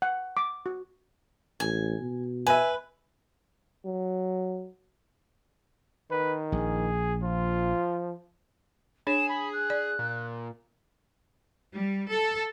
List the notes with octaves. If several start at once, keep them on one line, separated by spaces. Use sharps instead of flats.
F#5
D6
F#4
A1 G#5
B2
B4 E5 G#5
F#3
D#3 B4
A#1 G#4
F3 F4
D4 G#4 C#5 E7
B5
F#6
D5
A#2
G3
A4